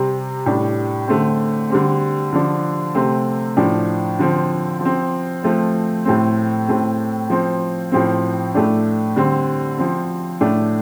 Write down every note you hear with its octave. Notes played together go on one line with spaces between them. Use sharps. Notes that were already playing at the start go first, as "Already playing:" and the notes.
Already playing: C3 G3 C4
A2 G3 D4
D3 A3 C4
D3 G3 C4
D3 F3 D4
C3 A3 C4
A2 F3 D4
D3 F3 C4
F3 C4
F3 A3 C4
A2 A3 C4
A2 A3 C4
F3 C4
A2 F3 C4
A2 A3 D4
D3 G3 C4
F3 C4
A2 A3 D4